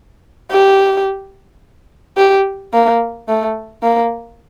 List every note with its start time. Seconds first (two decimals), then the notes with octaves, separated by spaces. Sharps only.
0.51 G4
2.17 G4
2.73 A#3
3.28 A3
3.83 A#3